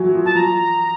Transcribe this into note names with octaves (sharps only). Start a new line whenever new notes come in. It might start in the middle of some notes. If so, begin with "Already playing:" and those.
Already playing: E3 F#3
F3
A5
F3 A#5